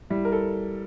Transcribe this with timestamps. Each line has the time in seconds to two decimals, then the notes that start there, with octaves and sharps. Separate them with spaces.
0.10 G3 E4
0.25 A#4
0.32 A4